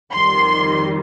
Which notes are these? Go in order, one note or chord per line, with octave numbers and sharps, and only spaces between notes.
F2 D#3 G3 C6